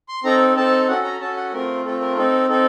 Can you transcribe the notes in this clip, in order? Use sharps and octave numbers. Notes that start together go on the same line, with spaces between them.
C6
C4 D#4 A4 A#5
C4 D#4 A4 A5
C#4 F#4 A4 F#5
A#5
C#4 F#4 A4 A5
F#5
A3 C4 F4 A#4
A3 C4 F4 A4
A#4
C4 D#4 A4
C4 D#4 A4